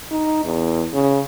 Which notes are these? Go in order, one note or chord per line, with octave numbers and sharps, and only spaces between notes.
D#4
E2
C#3